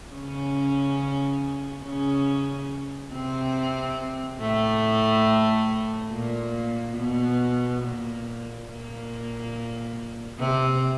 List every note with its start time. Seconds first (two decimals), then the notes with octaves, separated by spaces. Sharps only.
0.13 C#3 C#4
1.84 C#3 C#4
3.12 C3 C4
4.40 A2 A3
6.11 A#2 A#3
6.96 B2 B3
7.82 A#2 A#3
8.67 A#2 A#3
10.39 C3 C4